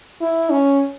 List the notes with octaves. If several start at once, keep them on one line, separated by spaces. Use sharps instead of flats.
E4
C#4